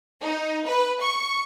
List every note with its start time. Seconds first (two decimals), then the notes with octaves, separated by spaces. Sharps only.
0.22 D#4
0.65 B4
1.02 C#6